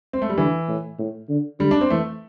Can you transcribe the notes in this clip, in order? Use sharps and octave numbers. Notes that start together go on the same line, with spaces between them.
C4
A3
G3
D3 E3
A2
A2
D3
D3 G3
D4
C4
E3 A3